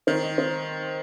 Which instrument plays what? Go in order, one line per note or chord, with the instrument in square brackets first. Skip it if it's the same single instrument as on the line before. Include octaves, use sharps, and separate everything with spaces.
[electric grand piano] D#3 [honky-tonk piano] C4
[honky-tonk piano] D#4
C4